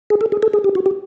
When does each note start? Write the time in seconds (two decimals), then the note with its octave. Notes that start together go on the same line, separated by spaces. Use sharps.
0.10 G#4
0.21 A4
0.32 G#4
0.43 A4
0.53 G#4
0.64 G4
0.75 F#4
0.86 G4